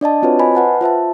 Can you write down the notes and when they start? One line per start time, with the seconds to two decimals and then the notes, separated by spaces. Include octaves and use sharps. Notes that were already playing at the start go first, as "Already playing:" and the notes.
0.01 D4 D5 D#5 A5
0.22 C4 F4 F#4 B4 C#5
0.39 C5 D#5 G#5 B5
0.55 B4 F#5 A5
0.81 F4 C5 E5 A5